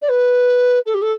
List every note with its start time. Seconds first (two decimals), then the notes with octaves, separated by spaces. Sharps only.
0.01 D5
0.08 B4
0.86 A4
0.94 G4
1.01 A4